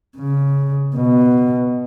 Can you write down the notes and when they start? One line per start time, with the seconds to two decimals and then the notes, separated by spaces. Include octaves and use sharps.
0.17 C#3
0.97 B2